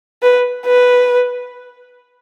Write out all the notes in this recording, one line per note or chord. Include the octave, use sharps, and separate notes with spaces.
B4
B4